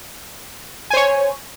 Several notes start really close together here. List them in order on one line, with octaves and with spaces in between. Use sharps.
G#5 C5 C#5